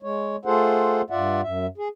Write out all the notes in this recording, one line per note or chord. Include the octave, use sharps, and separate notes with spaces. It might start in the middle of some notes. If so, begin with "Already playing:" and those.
G#3 C#5
A3 F4 G#4 A4 C5 F#5
G2 F4 D5 E5 F#5
F#2 E5
G#4